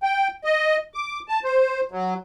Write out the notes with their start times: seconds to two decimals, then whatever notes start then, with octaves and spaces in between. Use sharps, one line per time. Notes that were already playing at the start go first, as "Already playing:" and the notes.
0.03 G5
0.44 D#5
0.94 D6
1.28 A5
1.44 C5
1.91 F#3